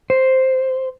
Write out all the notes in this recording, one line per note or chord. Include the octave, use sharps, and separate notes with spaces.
C5